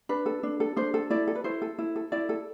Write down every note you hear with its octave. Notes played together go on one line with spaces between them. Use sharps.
D4 B4
A4
D4
A4
D4 C5
A4
E4 D5
A4
B4
E4 C5
A4
E4
A4
E4 D5
A4